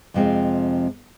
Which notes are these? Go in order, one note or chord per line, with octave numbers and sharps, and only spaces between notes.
F2 C3 F3 G#3 C4